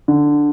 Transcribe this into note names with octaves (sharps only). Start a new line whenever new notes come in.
D3